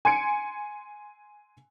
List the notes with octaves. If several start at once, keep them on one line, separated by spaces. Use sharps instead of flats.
G#5 C6 G#6 C#7 D7